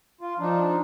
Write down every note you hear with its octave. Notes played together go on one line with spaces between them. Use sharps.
F4
F3 D4 D#4